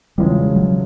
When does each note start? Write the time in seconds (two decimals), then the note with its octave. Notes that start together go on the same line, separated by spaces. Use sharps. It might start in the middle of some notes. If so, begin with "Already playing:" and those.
0.18 E1 E2 C#3 F3 G3 G#3
0.56 F#3